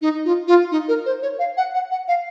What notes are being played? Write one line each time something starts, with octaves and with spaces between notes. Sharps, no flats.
D#4
F4
F4
D#4
A#4
C5
C#5
F5
F#5
F#5
F#5
F5